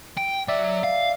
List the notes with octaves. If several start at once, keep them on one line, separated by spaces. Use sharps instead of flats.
G5
F#3 D5 E5
F5